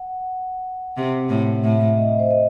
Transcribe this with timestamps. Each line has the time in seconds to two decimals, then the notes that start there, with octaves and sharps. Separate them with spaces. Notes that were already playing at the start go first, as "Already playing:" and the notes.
Already playing: F#5
0.97 C3
1.29 A2
1.63 A2 E5
1.98 D#5
2.19 C5
2.31 D#5